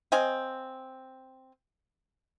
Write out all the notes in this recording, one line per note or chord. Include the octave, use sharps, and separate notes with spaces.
C4 D#5 F5 G#5